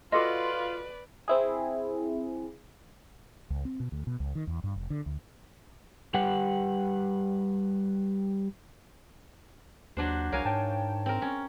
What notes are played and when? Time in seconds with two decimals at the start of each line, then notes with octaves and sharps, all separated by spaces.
0.12 F4 F#4 A4 B4 D5 D#5 C6 D6
1.28 C4 E4 G#4
3.50 C#2
3.65 C4
3.80 B2
3.92 D2
4.07 B2
4.20 C#2
4.35 D#3
4.47 E2
4.64 G2
4.76 F1
4.90 D3
5.06 D2
6.14 G3 G4 B4 F#5 G5
9.97 D#2 F#3 D4 C5
10.32 C2 A#4 C#5 F5 G#5
10.45 G#2 C#5 G5 A5
11.06 C4 A#4
11.22 C#4